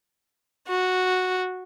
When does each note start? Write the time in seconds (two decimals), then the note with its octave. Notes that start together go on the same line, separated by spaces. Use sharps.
0.68 F#4